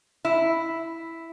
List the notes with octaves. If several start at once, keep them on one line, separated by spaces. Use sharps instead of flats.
E4